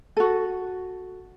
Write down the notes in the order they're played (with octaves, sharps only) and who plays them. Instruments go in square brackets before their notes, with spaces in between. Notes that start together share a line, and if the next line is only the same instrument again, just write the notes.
[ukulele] F#4 A4